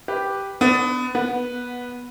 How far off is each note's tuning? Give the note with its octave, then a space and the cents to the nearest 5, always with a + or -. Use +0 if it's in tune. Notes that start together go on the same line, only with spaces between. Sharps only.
G4 +0 B4 +0
B3 +25 D4 +0
B3 -15 B4 -5 F#5 +0